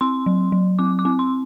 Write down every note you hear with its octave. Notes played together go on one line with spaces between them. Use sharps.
C4 C6
F#3
F#3
C4 D6
D6
C4
C6